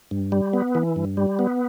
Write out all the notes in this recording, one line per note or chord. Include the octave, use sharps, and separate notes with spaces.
G2
G3
B3
E3
G2
G3
B3